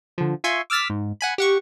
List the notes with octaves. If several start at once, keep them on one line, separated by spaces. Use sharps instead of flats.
D3 F3
F4 E5 G#5 C6 C#6
D6 E6 F6 A6 B6
G#2
F#5 G#5 B5
G4 F#5 C#6